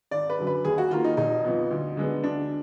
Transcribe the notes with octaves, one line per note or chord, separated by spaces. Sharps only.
G#1 D5
B4
F#2 D3 F#3
B4
D#2 G#4
F#4
D#3 A#3 F4
D#4
F1 D#4
F2 F3 B3
D2
D3 G#3 B3
D2 D4